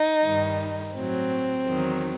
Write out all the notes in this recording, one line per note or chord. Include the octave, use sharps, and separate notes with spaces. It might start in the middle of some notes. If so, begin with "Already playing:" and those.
Already playing: D#4
G2 D#3 G3
A2 F#3 C4
E2 D#3 F#3